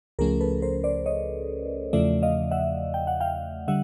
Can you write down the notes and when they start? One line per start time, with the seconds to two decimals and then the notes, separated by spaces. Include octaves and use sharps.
0.19 C#2 C#3 F3 A3 C#4 G#4 A#4
0.41 A4 B4
0.62 A#4 C5
0.84 C5 D5
1.06 C#5 D#5
1.93 E2 C#3 F3 A3 D5 E5
2.22 D#5 F5
2.51 E5 F#5
2.94 G5
3.07 F#5
3.20 F5 G5
3.68 D3 G3 E5 F#5